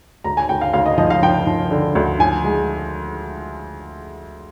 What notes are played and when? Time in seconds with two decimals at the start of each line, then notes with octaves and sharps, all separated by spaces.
0.24 D2 A#5
0.37 G#5
0.49 D2 G5
0.61 F5
0.73 D2 F5
0.86 D#5
0.98 F3 D#5
1.10 F5
1.23 F3 G5
1.47 F3
1.71 D3
1.95 D2
2.19 F3 G#5
2.44 G#3